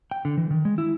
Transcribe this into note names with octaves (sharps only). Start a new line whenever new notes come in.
G5
D3
E3
D#3
G#3
E4